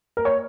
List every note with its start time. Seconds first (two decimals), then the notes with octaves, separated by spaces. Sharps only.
0.17 A#4
0.25 C#5